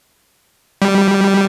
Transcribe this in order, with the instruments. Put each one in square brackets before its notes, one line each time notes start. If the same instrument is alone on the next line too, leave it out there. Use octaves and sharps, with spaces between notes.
[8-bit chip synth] G3